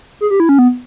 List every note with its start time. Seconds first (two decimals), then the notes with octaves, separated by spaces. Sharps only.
0.21 G#4
0.30 G4
0.40 E4
0.49 C#4
0.59 B3